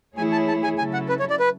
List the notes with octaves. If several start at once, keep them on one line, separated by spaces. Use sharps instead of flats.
E3 A3 E4 G#4 C#5 G#5
A5
A5
G#5
C#3 F#3 C#4 E4 A4 G#5
F#5
B4
C#5
D5
B4